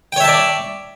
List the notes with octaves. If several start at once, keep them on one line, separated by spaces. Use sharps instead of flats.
C#5 D5 E5 G5 A5